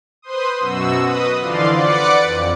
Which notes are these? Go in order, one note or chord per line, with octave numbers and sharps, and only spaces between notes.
B4 C5 C6 D#6
F#2 B2 F#4 E6
B4 D#5 D#6
D3 E3 F3 D5 F5 C6
B4 D5 F#5 D6 F#6 C#7
F2